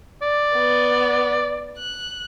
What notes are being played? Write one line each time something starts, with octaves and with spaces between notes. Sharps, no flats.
D5
B3
F#6